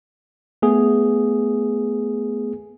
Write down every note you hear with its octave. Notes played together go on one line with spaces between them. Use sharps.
A3 B3 G#4